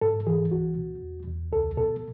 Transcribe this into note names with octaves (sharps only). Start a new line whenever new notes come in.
G#2 A4
E3 G#4
C#2 F#4
B2
E2
E2
C#2 A4
B2 A4